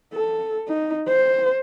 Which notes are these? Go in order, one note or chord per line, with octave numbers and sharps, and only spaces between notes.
A4
D#4
C5